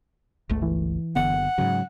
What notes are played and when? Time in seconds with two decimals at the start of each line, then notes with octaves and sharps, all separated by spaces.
0.49 G1 C#2 A3
0.62 E3
1.16 F#1 D3 B3 F#5
1.58 G#2 C#3 F#3